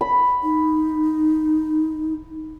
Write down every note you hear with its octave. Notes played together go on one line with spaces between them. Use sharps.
B5
D#4